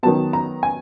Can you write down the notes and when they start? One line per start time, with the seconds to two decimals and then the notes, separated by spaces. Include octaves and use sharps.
0.03 D#3 F#3 B3 A5
0.33 A#5
0.63 G#5